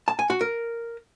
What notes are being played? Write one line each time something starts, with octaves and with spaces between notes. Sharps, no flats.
A5
G#5
F#4
A#4